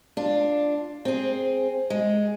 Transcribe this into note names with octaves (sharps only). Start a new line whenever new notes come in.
D4 F4
C4 G#4
G#3